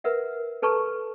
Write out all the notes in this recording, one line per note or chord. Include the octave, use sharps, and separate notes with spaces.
A#4 B4 E5 F#5
A4 B4 A5 A#5 C#6